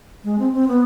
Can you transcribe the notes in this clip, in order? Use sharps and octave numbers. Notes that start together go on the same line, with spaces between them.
G#3
C4
C4
B3